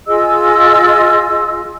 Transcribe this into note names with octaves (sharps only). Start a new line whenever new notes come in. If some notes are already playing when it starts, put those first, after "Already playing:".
F4 G#4 D#5 E6